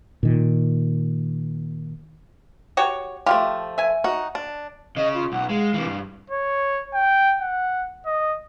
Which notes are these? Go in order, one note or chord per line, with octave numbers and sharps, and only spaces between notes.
A#2 D#3
F#4 G4 C#5
F3 G#3 A3 G4
E5 G#5
D#4 F#4
D4
C#3 D#5
F4
B1 F#5
G#3 F5
C3 E3
G2
C#5
G5
F#5
D#5